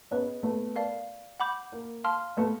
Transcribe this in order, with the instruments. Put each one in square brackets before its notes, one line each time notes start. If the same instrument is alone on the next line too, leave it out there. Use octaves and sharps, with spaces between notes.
[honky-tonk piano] B3 C#4 [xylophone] G#4 B4 D#5
[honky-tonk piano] A3 B3
[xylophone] A#4 D5 F5 A5
F#5 B5 D6 G6
[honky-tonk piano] A#3
[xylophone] F5 A5 C6 F6
[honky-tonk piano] A3 B3